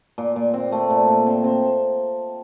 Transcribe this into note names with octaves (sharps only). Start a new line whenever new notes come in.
A#2
A#2
C4
A3
A#2
A#2
C4
C4